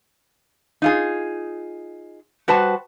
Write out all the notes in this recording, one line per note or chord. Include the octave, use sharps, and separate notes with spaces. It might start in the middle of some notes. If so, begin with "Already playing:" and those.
D#4 F4 G#4
G3 F#4 B4 C5 A5